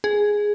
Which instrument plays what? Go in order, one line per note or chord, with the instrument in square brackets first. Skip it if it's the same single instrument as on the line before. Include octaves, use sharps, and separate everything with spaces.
[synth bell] G#4